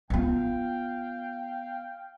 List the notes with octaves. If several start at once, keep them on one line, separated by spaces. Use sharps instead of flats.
B3 F4 F5 G5